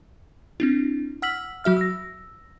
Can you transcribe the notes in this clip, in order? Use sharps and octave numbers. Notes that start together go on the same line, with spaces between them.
C4 D4 E4
F#5 E6 F6 B6 F#7
F#3 F#4 E5 F6
E6 A#6